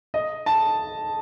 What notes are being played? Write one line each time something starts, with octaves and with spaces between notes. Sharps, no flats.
D#5
A5